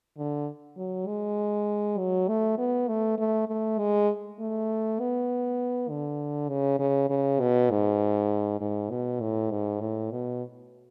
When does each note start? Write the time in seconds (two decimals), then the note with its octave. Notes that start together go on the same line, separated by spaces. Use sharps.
0.18 D3
0.77 F#3
1.07 G#3
1.99 F#3
2.28 A3
2.58 B3
2.88 A3
3.18 A3
3.49 A3
3.78 G#3
4.39 A3
5.00 B3
5.89 D3
6.49 C#3
6.79 C#3
7.10 C#3
7.40 B2
7.70 G#2
8.61 G#2
8.90 B2
9.21 A2
9.51 G#2
9.81 A2
10.11 B2